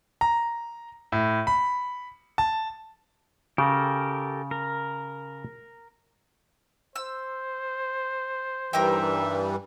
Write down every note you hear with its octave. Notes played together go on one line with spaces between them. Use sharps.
A#5
A2
B5
A5
C#3 G4 A4 A#4
A#4
C5 E6
G2 E3 G3 D#4 G4 A#4 E5 G5